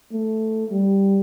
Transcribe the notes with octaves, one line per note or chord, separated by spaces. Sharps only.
A3
G3